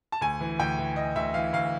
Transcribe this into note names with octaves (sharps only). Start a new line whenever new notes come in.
A5
D2 G#5
E3
D2 G5
E3
D2 D#5
D2 E5
E3 F5
D2 F5